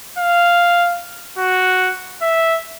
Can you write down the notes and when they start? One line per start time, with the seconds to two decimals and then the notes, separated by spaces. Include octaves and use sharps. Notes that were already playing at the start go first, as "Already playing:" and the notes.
0.18 F5
1.38 F#4
2.22 E5